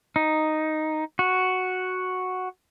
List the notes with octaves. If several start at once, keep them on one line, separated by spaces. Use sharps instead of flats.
D#4
F#4